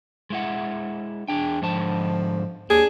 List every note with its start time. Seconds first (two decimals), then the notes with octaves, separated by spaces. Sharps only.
0.30 G#3 E4 F#5
1.28 E2 D4 G#4 G5
1.62 G#2 D3 F3 A5
2.70 D#2 D4 G#4